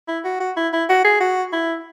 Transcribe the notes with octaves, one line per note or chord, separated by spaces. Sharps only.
E4
F#4
F#4
E4
E4
F#4
G#4
F#4
E4